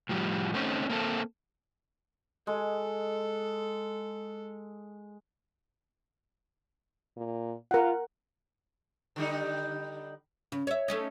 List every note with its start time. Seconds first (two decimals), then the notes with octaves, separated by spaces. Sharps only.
0.09 A2 F3 G3
0.54 A3 C4 C#4 D#4
0.90 A#3 C4 A4
2.47 G#3 A4
7.16 A#2
7.71 F4 A#4 F#5
9.16 D3 G3 D#4
10.52 C#3
10.67 C#5 E5
10.88 A3 C#4 D#4